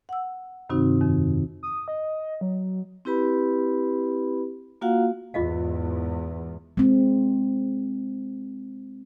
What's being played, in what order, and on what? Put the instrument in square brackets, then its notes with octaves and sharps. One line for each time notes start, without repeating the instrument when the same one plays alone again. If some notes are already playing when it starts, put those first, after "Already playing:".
[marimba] F#5 E6
G2 C3 D#3 C4 D#4 F#4
F2 D#3
[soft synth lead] D#6
D#5
F#3
[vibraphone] C4 E4 G4 B4 B5
A#3 F4 F#4 F5 F#5
[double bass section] E2 G#2 [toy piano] F4 D#5 F5
[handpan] G#3 C4